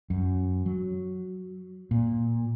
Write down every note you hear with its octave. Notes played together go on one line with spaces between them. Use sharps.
F#2
F#3
A#2